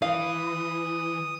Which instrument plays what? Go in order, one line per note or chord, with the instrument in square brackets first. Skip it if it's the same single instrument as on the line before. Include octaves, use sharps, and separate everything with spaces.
[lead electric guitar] E3 [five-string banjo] F5 [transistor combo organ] D#6